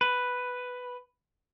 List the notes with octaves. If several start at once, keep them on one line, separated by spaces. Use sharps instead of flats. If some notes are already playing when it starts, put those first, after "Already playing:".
B4